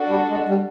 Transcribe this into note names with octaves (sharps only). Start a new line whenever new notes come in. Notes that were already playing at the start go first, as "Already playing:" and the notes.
Already playing: D4 F#4 A4
G3
G#3
G3